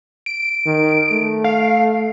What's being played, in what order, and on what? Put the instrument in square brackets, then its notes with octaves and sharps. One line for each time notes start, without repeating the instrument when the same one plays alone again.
[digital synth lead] D7
[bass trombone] D#3
A3
[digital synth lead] F5